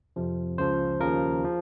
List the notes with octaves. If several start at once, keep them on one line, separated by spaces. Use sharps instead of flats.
F2 C3 F3
C#2 C#3 F3 C5
D#2 C#3 F3 A#4
F3